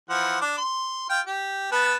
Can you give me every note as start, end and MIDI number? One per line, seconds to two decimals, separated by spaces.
0.10 0.37 52
0.10 0.37 53
0.10 0.37 78
0.41 0.56 62
0.41 0.56 86
0.58 1.06 84
1.10 1.20 65
1.10 1.20 79
1.27 1.68 67
1.72 1.96 59
1.72 1.96 71
1.72 1.96 81